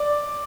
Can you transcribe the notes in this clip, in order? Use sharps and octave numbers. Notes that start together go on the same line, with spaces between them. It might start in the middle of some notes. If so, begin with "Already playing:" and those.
Already playing: D5